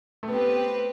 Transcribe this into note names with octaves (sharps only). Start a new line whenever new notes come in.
A3
B3 C4 G4 B4